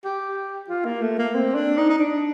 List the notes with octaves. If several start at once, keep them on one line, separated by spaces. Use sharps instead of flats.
G4
F4
A#3
A3
A#3
C4
D4
D#4
D#4
D4